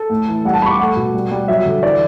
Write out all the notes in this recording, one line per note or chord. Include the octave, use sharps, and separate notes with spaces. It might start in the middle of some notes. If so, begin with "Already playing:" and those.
Already playing: A4
A2
E3
G3 F#5
A5
G3 B5 C#6
D6
A3 F#5
B2
G3
G3
F#3 E5
D3
E3 D5